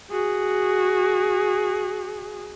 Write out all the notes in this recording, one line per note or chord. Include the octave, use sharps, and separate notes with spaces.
F#4 G#4